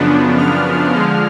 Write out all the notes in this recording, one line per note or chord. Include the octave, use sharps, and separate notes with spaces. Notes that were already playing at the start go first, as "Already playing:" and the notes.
Already playing: F#2 C#3 F3 B3 D4
F6
D3 F3 G#3